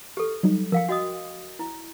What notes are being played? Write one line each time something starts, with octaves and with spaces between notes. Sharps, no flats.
G4 A4 F6
F#3 G3 D#4
F3 A#4 F5 G5
F#4 D#5 G5 D#6
E4